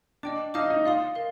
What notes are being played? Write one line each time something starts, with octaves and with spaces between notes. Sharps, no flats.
D4 D#5 G5 D6
D#4 F5 A5 D6 F6
D#4
F4 D5 F5 C6 D#6
A#4 F5